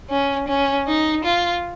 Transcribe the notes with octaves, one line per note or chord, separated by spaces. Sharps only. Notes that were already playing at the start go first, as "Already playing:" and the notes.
C#4
C#4
D#4
F4